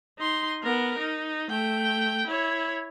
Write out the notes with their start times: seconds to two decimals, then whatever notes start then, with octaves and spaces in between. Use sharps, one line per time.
0.18 D#4 C6
0.63 B3 A#4
0.98 D#4
1.50 A3 G5
2.27 E4 C#5